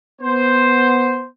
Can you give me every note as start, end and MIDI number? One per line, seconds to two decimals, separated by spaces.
0.21 1.26 59
0.21 1.26 72